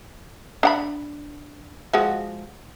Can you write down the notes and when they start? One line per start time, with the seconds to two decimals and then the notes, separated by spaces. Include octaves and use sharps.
0.63 D4 F#5 B5
1.93 F3 G#3 F#4